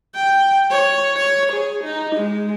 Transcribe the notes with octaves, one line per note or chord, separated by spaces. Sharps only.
G5
C#5
C#5
G#4
D#4
G#3